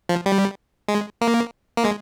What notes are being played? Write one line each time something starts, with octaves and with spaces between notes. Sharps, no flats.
F3
G3
G#3
A#3
A#3
G#3